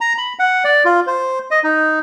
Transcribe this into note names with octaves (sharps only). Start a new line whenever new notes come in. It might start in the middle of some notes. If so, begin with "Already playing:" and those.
A#5
B5
F#5
D5
F4
C5
D#5
D#4